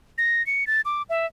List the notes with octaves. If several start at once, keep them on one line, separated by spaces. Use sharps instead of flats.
A#6
C#7
A6
D6
E5